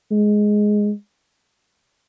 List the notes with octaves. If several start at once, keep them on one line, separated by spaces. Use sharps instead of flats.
G#3